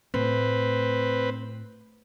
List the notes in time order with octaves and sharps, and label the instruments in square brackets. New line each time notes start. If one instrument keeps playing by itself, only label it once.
[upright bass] A2 [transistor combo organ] C4 B4